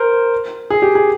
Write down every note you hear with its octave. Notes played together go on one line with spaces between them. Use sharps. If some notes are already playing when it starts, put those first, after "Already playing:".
Already playing: A#4 C5
G#4
G4
G#4